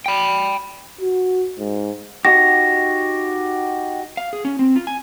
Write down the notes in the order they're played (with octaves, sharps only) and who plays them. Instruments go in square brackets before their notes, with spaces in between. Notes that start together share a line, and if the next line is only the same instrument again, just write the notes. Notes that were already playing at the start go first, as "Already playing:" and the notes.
[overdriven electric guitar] G5 B5
[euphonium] F#4
G#2
[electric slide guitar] D#4 F#4 G4 [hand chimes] A#6
[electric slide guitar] F5
G#4
C#4
C4
F4
G#5